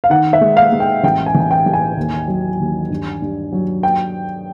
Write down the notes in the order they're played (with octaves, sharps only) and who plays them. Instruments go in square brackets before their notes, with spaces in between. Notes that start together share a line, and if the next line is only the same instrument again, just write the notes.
[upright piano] F5
D#3 F#5
E5
G#3
F5
G#3
G5
A1 G5
G#5
A1
G#5
G5
A1
G#5
D#2
F#3
D#2
G2
G2
F#3
G5